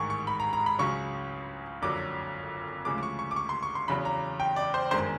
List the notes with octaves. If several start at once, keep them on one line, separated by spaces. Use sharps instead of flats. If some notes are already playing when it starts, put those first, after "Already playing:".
Already playing: A1 G#2 D#3 G#3 C#6
C#6
B5
A#5
A#5
B5
C#2 C#3 F#3 C#6
F#1 F2 D3 F#3 D6
D2 C#3 F3 G#3 D6
D6
C#6
C#6
D6
C#6
C6
C#6
C6
E2 C#3 F#3 B5
A#5
G5
D5
C5
G1 F#2 D#3 G#3 C5